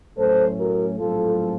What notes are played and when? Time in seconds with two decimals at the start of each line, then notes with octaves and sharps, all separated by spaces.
0.17 A2 F#3 A3 C#4 A4 C5
0.58 F#4 A#4
0.99 A#1 A2 F#3 C4 F4 A4